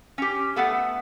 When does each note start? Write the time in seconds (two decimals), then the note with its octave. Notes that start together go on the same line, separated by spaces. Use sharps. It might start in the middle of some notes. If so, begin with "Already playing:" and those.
0.18 C#4 G4
0.56 A3 B3 A4 F#5